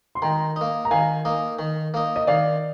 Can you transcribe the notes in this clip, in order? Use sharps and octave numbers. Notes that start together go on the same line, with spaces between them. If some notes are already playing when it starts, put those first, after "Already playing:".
C6
D#3 G5 A#5
A#3 D#4
A#5
D#3 F5 G#5
A#3 D#4
D#3
A#3 D#4
D#5
D#3 D5 F5